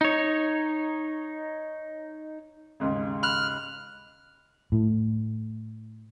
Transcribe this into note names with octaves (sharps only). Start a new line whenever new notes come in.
D#4 C#5
D#2 G#2 C#3
B5 F6 F#6
A2